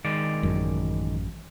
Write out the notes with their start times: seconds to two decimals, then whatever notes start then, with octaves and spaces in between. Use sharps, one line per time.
0.05 D#3 G#3 D5
0.43 A1 F#2